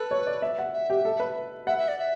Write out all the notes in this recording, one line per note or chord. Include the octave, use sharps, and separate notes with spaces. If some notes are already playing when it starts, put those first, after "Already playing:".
Already playing: A4 B4
C#5
D5
E5
F#5
E5
G4
A4
B4
E5 F#5
E5
D5
E5